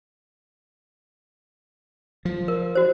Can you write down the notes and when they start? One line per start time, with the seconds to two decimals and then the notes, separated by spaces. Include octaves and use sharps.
2.25 F3
2.48 A#4
2.75 F#4 C5